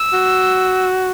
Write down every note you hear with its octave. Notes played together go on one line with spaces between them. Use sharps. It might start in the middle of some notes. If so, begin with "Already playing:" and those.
Already playing: E6
F#4